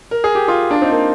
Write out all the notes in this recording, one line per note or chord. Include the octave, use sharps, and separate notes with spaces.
A#4
G#4
G4
F4 G#4
D4 F4
C4 D#4
A#3 D4